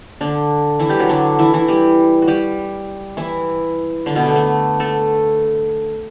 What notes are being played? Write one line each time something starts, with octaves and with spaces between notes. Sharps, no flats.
D3 D4
E3 E4
G3 G4
F#3 F#4
D3 D4
E3 E4
E3 E4
G3 G4
F#4
G3 G4
E3 E4
D3 D4
B2 B3
A3
A3
A3 A4